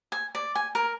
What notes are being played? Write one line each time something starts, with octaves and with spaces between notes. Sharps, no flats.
G#5
D5
G#5
A#4